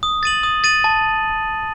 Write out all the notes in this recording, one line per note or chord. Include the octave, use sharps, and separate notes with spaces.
D#6
A6 D#7 F#7
D#6
A6 D#7 F#7
A5